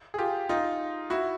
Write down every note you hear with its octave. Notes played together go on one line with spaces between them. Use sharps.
G#4
F4 G4
D#4 F4
E4 F#4